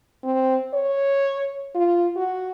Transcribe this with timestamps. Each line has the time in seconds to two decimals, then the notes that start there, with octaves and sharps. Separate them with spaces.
0.24 C4
0.74 C#5
1.75 F4
2.16 F#4